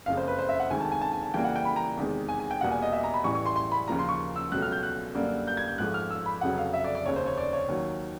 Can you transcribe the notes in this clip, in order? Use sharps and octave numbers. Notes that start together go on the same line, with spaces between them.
F#1 F2 C#3 F5
C5
B4
C5
E5
F#5
D2 C3 D#3 G#3 G#5
A5
G#5
A5
G#5
A5
F2 C#3 E3 G3 A#3 G5
F#5
G5
B5
A#5
E2 C3 D#3 G#3
G#5
G#5
G5
E2 B2 G3 A#3 F#5
G#5
D#5
E5
A#5
B5
A1 A2 E3 G3 C#6
C#6
C6
C6
B5
D#2 C#3 F3 A#3 A#5
C6
C#6
E6
C#2 B2 F#3 A3 F#6
F6
G6
F#6
F#2 D3 G3 A#3
G6
G#6
G6
G#1 G#2 F3 A3 F#6
F6
E6
B5
F1 F2 C#3 F#3 F#5
F5
E5
D5
D5
F1 D#2 C#3 C#5
C5
C#5
D5
C#5
D#2 D#3 F#3